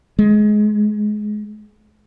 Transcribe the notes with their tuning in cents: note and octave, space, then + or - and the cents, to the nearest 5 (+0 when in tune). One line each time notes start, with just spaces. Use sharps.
G#3 +20